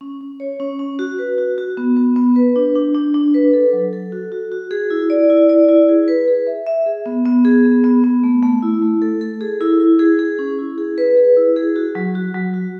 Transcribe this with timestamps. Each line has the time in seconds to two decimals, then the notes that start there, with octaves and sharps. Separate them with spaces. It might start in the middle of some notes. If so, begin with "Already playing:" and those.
0.01 C#4
0.21 C#4
0.40 C#5
0.60 C#4
0.79 C#4
0.99 F#4
1.19 B4
1.38 F#4
1.58 F#4
1.77 B3
1.97 B3
2.16 B3
2.36 B4
2.56 D4
2.75 D4
2.95 D4
3.14 D4
3.34 B4
3.53 A4
3.73 F#3
3.93 A4
4.12 F#4
4.32 F#4
4.52 F#4
4.71 G#4
4.90 E4
5.10 D5
5.30 E4
5.49 D5
5.69 E4
5.89 G#4
6.08 B4
6.28 G#4
6.47 E5
6.66 E5
6.86 G#4
7.06 B3
7.25 B3
7.45 G#4
7.65 B3
7.84 B3
8.04 B3
8.23 A3
8.43 A3
8.63 E4
8.82 A3
9.02 A4
9.21 A4
9.41 G#4
9.61 E4
9.80 E4
9.99 G#4
10.19 G#4
10.39 C#4
10.58 E4
10.78 G#4
10.98 B4
11.17 G#4
11.37 E4
11.56 G#4
11.76 F#4
11.95 F#3
12.15 F#4
12.34 F#3
12.54 F#4